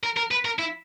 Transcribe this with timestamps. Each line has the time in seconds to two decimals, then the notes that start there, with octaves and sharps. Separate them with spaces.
0.04 A#4
0.17 A#4
0.31 B4
0.45 A#4
0.59 E4